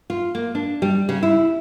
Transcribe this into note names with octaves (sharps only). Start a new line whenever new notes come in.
F4
A#3
D4
G3
C#3
E4